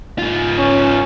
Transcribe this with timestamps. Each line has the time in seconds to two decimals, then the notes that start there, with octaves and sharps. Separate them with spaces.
0.18 G#2 F4
0.58 C#4